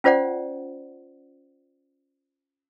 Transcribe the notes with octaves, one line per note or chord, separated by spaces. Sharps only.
C#4 F4 C5 D5 F#5